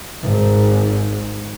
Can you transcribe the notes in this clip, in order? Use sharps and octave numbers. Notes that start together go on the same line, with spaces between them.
G#1 G#2